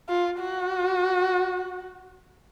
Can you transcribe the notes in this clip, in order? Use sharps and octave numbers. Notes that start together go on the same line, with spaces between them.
F4
F#4